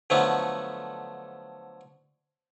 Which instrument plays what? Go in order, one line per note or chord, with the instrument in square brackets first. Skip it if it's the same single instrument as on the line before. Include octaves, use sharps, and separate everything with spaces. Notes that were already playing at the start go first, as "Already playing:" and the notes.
[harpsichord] D3 F3 F#3 A3 B3